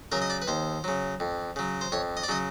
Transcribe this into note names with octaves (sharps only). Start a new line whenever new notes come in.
C#3 F#3 A#4
D#5
D5
B4
D#2 C5
C#3 F#3
F2
C#3 F#3
C5
F2 C#5
D#5
D5
C#3 F#3 D#5